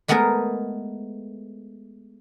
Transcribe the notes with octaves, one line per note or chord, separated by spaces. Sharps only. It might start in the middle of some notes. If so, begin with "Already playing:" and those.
G#3 A3 B3 G#4 A#4